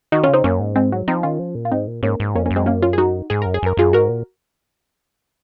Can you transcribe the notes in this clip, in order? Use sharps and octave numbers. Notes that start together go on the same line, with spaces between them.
D#3 D#4 F#4
C#3 C#4 F4
C4 D#4
F#2 A#3 C#4
G#2
G#3 C4
F#3
F3 C4 D#4
D#3 C#4 F4
F3
A#2
F4
G#2 C4 D#4
A#2
G#2 A#3 C#4
G#2
F2 A#3 C#4
A#3 C#4
F#2
G#3 C4
A#3 C#4
C#4 F4
G#4
D#4 F#4
G#2 G#4
F#2 A#4
G#4
F#2 A#4
F#2 F4 G#4
G#2 F#4 A#4
A#2